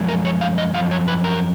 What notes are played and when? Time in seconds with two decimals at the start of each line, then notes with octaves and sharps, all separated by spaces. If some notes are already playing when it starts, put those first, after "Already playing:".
Already playing: F#2 F3 G#3
0.08 A#4
0.25 C#5
0.41 F5
0.58 D#5
0.74 F#2 F3 F5
0.91 C#5
1.08 B4
1.24 A#4